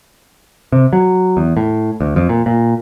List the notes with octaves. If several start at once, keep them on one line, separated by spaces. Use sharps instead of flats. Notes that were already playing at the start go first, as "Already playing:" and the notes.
C3
F#3
E2
A2
D2
F2
A#2
A#2